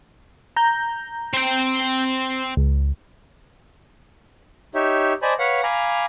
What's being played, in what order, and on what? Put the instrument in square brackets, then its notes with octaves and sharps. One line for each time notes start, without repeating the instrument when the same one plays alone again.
[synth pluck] A#5 G6
[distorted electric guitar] C4 G5
[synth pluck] C#2
[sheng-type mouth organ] D#4 G4 C#5 E5
C5 D5 D#5 G#5 A5 B5
B4 C#5 F5 F#5
F5 G#5 A#5 B5 D6